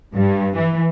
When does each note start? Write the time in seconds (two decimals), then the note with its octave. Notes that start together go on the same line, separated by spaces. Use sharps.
0.15 G2
0.57 E3